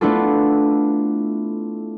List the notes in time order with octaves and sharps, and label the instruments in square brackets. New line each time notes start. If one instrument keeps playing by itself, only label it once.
[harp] A3 B3 D4 E4 F4 A4